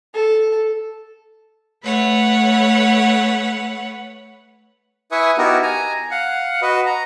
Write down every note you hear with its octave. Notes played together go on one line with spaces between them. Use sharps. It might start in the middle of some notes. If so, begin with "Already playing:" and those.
A4
A3 B4 C#5 F#5
E4 B4 E5 G#5 C#6 D#6
B3 D#4 E4 F#4 G4 A#4
G#5 A#5
F5 F#5
F#4 B4 D#5
A#5